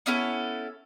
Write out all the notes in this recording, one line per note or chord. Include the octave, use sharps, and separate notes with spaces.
B3 C#4 E4 A4